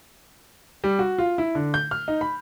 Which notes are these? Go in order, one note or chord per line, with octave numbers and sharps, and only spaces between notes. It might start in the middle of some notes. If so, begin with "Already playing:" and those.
G3
F#4
F4
E4
D3
G6
F6
D#4
B5